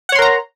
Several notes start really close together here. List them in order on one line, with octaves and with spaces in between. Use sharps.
F#5 C#5 C6 A#4 A#5